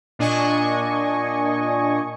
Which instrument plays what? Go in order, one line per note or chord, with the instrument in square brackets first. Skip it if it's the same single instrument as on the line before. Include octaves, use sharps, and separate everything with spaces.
[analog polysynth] A#2 D4 D#5 G#5 C#6